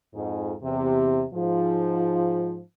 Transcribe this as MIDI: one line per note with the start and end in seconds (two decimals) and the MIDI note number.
0.14 0.52 41
0.14 0.52 44
0.63 1.22 40
0.63 1.22 48
1.33 2.59 44
1.33 2.59 53